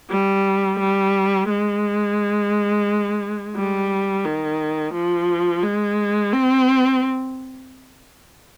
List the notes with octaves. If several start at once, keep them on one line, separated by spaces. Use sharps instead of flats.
G3
G3
G#3
G3
D#3
F3
G#3
C4